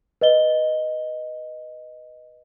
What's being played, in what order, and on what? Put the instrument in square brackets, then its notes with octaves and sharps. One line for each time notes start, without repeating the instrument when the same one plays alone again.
[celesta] B4 D#5 G7